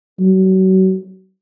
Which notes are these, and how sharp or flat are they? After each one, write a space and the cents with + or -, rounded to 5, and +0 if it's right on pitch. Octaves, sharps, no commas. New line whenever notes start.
F#3 +35